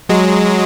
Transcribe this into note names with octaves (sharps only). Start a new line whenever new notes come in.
F#3 G#3